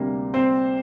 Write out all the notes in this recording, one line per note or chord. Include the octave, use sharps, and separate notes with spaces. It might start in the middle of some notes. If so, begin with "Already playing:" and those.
Already playing: D2 C3 G3 A#3
C4 C5